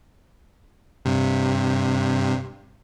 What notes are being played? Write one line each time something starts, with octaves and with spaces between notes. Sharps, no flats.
G2 C3